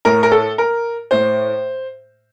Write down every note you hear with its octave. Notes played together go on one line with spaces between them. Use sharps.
A2 A#4
A#4
A4
A#4
A2 C5